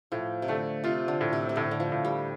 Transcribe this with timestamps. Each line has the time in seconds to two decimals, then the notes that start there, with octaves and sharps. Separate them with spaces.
0.12 A2 F3
0.42 C3
0.48 D3 A3
0.84 C3 F4
1.08 D3
1.21 A2
1.33 C3
1.49 C3
1.56 A2 D3
1.71 D3
1.80 F3
1.92 A2
2.05 G3